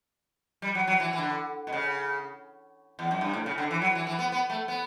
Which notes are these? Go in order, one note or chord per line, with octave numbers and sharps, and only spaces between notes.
G3
F#3
F#3
E3
E3
D3
B2
C#3
E2
F#2
G2
A2
C#3
D3
E3
F#3
E3
E3
B3
B3
A3
B3